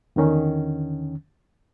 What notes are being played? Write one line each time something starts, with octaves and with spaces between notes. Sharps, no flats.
E2 D3 D#3 C#4